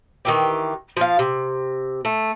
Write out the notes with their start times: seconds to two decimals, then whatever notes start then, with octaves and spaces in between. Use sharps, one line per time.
0.25 D#3 E3 G4
0.97 F3 F5
1.19 C3
2.05 A3